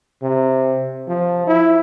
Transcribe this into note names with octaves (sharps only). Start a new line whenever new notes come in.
C3
F3
E4